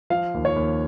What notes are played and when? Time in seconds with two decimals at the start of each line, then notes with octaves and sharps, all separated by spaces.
0.10 F3 F5
0.34 D#2
0.45 C#5
0.56 D#2